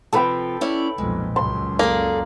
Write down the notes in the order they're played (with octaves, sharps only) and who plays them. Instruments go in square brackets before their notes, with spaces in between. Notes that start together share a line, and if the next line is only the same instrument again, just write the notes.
[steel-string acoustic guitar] C3 F3 [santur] A4 B4 G5
[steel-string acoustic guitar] C#4 E4 D5
[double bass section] B1 F2 A#2 [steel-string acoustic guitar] G#3
[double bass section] C#2 F#2 [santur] C6
[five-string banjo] A#3 [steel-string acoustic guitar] G#4 A4 D5